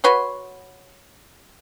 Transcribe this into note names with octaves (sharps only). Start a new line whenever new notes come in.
F#4 B4 C#5 C6